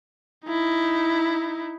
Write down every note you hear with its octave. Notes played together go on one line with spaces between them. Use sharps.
D#4 E4